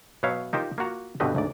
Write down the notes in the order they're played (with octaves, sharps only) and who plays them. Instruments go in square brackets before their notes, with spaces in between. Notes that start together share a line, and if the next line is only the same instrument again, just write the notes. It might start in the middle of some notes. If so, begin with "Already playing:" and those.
[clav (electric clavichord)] B2 F#3 B4 C#5 E5 F5
D#4 F4 G4 A#4 C5
A#3 F4 F#4 A#5
G2 B2 D3 C4 B4 D#5
D2 G#2 D5